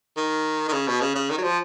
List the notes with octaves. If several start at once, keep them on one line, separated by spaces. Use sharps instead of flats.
D#3
D#3
C#3
B2
C#3
C#3
D#3
F#3
F3